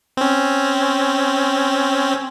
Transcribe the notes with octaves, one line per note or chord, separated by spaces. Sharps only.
C4 C#4